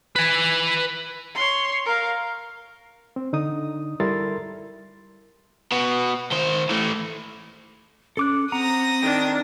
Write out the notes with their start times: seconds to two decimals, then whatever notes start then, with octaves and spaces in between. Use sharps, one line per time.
0.16 B4 G#5
1.35 C#5 C6
1.86 A#4 F5
3.16 C4
3.33 D3 D#4 D#6
4.00 G3 E4 A4 A#4 C6 A6
5.72 B2 B3
6.32 D#3 C5
6.69 E3 A3
8.17 C#4 A4 D6 F#6
8.52 C4 F#5 A#5 D#6 A#6
9.03 D#3 D4 G5